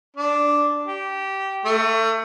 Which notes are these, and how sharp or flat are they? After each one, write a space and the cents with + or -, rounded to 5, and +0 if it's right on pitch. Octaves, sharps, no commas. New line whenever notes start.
D4 -5
G4 -20
A3 +30